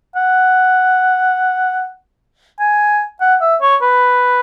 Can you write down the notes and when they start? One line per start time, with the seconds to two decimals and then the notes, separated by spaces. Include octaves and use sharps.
0.16 F#5
2.60 G#5
3.21 F#5
3.41 E5
3.62 C#5
3.82 B4